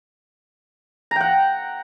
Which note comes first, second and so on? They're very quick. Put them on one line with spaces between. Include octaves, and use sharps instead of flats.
A#5 G5 F#5